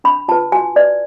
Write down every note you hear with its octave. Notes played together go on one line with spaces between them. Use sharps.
D4 B5
F4 B4 A5
F#4 G#5
B4 D5